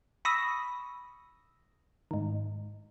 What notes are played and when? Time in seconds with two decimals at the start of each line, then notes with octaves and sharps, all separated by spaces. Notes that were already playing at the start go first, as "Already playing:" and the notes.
0.25 B5 C#6 D#6 E6 A#6
2.11 G#2 D#3